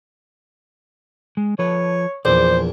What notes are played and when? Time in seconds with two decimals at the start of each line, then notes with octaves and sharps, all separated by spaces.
1.37 G#3
1.59 F3 A4 B4 C#5
2.25 A#1 E2 C5 D5